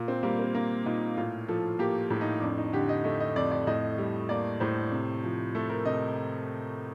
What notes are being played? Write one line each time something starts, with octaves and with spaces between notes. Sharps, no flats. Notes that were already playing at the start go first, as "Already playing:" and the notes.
Already playing: A#2
C4
G3 A#3
C4
A#3 C4
A#2 D#4
A2 F4
F3 A4
A#3 G4
A2
D#4
F2 D4
D#4
D3 G4
D#5
A3 D#5
D#5
F2 D5
D5
A2 D#5
G3
A#3 D5
A2 C5
C3
F3
A3 A4
A#4
C3 D#5